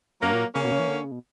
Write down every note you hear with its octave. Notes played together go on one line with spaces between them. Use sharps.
F#2 F#3 A#3
G2
A#2
C#3 A#3 C#4
B2
C#3
E3
D3
C#3
B2